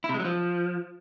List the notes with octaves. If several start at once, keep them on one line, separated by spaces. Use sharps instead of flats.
E4
C3
G#3
F#3
F3